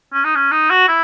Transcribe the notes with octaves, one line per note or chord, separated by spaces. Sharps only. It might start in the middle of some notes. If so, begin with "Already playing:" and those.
C#4
D#4
C#4
D#4
F#4
E4